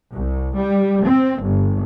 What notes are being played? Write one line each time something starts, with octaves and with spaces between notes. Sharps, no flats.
C2
G3
C4
G1